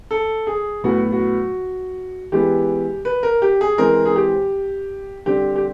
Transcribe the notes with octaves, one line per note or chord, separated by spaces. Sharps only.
A4
G#4
A2 F#3 B3 F#4
F#4
E3 G#3 B3 G4
B4
A#4
G4
G#4
E3 G#3 C4 A#4
G#4
G4
D3 G3 C4 G4
G4